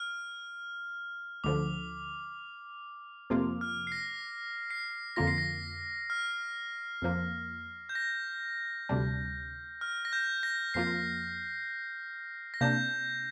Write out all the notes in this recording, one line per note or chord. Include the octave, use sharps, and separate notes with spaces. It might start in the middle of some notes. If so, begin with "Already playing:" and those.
Already playing: F6
D2 D3 F3 D6
F2 C3 F3 A#3 F4
F6
C7
A#6
C7
F2 D3 A#3 F4 A#6
C7
A#6
F6
F2 F3 A#3
G6
A#6
D2 C3 G3 D4
F6
A#6
G6
A#6
F2 F3 A#3 F4 C7
A#6
C3 A#3 D4 G6